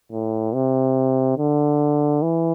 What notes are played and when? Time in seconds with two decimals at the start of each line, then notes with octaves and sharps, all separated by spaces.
0.12 A2
0.54 C3
1.38 D3
2.22 E3